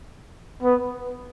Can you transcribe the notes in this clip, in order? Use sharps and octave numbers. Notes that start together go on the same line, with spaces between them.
B3